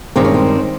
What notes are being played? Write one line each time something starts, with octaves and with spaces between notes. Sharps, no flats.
G2 D#3 G#3 C4
C#4
C4